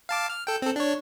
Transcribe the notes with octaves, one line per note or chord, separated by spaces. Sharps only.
F5 A5 D6
F6
A4 G5
C4 A4
D4 C#5